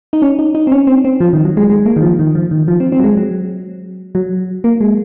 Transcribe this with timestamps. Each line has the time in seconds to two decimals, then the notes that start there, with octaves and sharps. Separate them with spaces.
0.13 D#4
0.22 C#4
0.39 D#4
0.55 D#4
0.67 C4
0.72 C#4
0.87 C4
1.04 C4
1.20 F3
1.33 D#3
1.45 F#3
1.57 G#3
1.70 G#3
1.86 A#3
1.96 D#3
2.02 F3
2.19 D#3
2.35 F3
2.51 D#3
2.68 F3
2.80 C4
2.92 C4
2.99 F#3
3.04 G#3
3.17 F#3
4.15 F#3
4.64 A#3
4.81 G#3